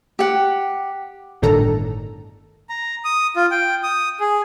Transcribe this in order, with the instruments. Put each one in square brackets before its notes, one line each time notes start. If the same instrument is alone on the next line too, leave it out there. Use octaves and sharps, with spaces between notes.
[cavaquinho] G4 F#5
[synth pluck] G1 A2 D#3 D4 A4 A#5
[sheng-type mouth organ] A#5
D#6
F4
G5
D#6
G#4